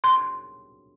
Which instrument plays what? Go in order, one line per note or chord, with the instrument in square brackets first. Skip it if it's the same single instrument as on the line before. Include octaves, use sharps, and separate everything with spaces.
[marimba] C6